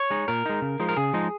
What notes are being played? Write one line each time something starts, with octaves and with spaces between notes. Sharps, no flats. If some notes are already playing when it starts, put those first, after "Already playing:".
Already playing: C#5
G#3 D#4
A#2 A#4
G#3 D#4
C#3
F3 G#3 D#4
A#4
C#3 G#4
F3 G#3 D#4